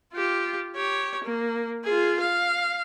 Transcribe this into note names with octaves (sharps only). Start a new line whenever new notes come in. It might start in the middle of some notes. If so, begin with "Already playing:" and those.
F4 G4
G4 C#5
A#3
F4 G#4
F5